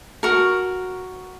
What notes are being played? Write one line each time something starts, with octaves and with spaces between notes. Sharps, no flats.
F#4 A#4